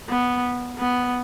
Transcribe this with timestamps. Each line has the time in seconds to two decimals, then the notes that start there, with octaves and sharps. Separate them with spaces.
0.09 B3
0.79 B3